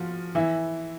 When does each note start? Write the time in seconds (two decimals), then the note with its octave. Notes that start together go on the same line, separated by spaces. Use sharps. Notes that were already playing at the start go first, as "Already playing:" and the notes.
Already playing: F3 F4 F#4
0.35 E3 E4